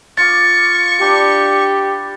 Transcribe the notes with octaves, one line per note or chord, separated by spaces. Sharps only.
F4 C#6 D6 A6
D4 G4 B4 G5